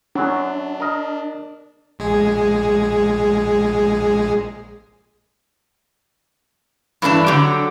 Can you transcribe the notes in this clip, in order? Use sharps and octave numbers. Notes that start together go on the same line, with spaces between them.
F#2 F#3 D4
A#4 D#5
A#1 G#3 G#4
G2 E3 A3 D4 A5
D3 F#3 G4